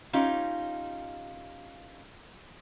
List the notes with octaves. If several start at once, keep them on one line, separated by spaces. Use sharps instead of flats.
C#4 D#4 F4 G4